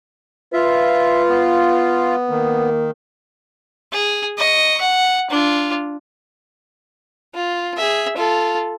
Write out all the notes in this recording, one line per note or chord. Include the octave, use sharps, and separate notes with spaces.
F4 B4 E5
B3
D#3 A#3
G#4
D#5 C#6
F#5
D4 F4
F4
G#4 E5
F4 A4